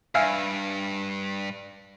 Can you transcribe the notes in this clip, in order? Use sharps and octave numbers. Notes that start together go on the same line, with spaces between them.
G2 E5 F5 G#5